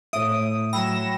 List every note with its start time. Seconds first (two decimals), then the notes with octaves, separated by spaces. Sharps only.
0.13 A2 E5 D#6 D7
0.73 F#3 G5 B5 E6 A#6 E7